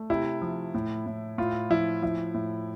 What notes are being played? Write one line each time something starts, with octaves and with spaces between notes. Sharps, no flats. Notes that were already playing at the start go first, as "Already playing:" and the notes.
Already playing: A3
C3 E4
F3
A2
A2
A2 F4
F3 E4
F3 E4
A2